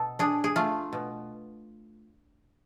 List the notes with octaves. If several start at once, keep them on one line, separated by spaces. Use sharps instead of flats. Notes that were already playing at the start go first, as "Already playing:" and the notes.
Already playing: B2 A4
D4 G#4
G#4
A3 F4
B2